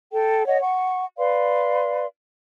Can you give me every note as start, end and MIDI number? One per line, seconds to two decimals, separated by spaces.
0.14 0.46 69
0.14 0.46 79
0.47 0.61 73
0.47 0.61 75
0.47 0.61 78
0.61 1.05 78
0.61 1.05 85
1.18 2.06 71
1.18 2.06 74
1.18 2.06 77
1.18 2.06 84